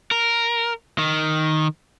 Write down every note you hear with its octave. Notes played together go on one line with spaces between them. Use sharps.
A#4
D#3